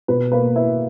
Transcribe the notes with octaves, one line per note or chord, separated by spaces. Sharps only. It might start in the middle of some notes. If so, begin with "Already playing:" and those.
B2 B4
A#3 B4
E4 B4